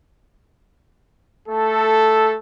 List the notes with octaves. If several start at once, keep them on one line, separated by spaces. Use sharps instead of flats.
A3 A4